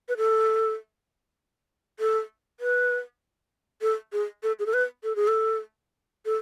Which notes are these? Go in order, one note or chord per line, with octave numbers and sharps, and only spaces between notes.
B4
A4
A4
B4
A4
G#4
A4
G#4
A4
B4
A4
G#4
A4
A4